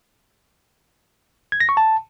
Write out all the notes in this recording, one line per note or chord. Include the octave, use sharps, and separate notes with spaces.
G#6
A#6
C#6
A5